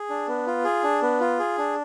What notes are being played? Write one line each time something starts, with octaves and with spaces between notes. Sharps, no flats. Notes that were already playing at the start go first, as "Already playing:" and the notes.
Already playing: G#4
D4
B3
F4
G#4
D4
B3
F4
G#4
D4